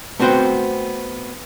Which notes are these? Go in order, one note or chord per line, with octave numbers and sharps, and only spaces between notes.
A3 B3 C4 F#4 C5 G5